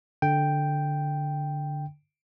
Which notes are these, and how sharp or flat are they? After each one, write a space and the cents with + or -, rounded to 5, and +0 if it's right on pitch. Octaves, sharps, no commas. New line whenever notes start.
D3 +0 G5 +0